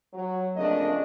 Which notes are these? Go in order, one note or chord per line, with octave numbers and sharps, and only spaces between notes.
F#3
F2 C#3 A3 A#3 D4 D#5